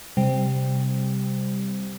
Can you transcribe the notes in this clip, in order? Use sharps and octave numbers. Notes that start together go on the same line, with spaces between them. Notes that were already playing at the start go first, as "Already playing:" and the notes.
C3 G3